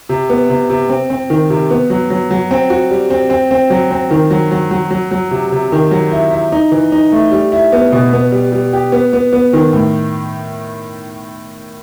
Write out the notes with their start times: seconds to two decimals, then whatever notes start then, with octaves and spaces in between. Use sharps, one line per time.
0.09 C3
0.30 B3
0.50 C3
0.69 C3
0.89 C4
1.10 C4
1.30 D#3
1.50 C3
1.70 B3
1.90 F#3
2.10 F#3
2.31 F#3
2.51 C4
2.70 F#4
2.91 G3
3.10 C4
3.30 C4
3.51 C4
3.70 F#3
3.91 C4
4.11 D#3
4.31 F#3
4.51 F#3
4.71 F#3
4.91 F#3
5.11 F#3
5.31 C3
5.52 C3
5.72 D#3
5.91 F#3
6.12 E4
6.31 E4
6.52 D#4
6.72 E3
6.92 D#4
7.12 A3
7.32 G3
7.52 E4
7.72 B3
7.92 B2
8.13 B3
8.32 G3
8.52 G3
8.73 G4
8.92 B3
9.13 B3
9.33 B3
9.53 D#3
9.73 A2